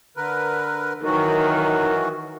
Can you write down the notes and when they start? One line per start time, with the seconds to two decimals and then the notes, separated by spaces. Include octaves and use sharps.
0.17 D3 A#4 B4
1.04 D#3 E3 F#3 F#4